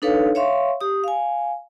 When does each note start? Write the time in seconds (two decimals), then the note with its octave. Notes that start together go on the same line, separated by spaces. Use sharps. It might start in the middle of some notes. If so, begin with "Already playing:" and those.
0.02 D4 D#4 A4 B4 C#5 F5
0.35 C#5 E5 F5 C6 C#6
0.81 G4 D#6
1.04 F5 G#5